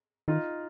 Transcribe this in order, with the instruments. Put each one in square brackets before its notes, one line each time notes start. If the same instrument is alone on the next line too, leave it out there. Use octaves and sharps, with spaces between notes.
[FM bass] D#3 [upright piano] D#4 F4